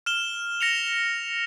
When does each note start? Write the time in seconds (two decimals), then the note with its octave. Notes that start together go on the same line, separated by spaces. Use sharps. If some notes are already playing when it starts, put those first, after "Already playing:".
0.06 F6 E7 G7
0.61 A#6 C#7 F7